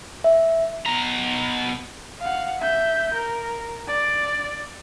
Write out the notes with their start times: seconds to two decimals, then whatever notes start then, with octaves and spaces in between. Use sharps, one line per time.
0.24 E5
0.86 B2 A#5
2.21 F5 F#5
2.61 E5 G6
3.14 A#4
3.88 D5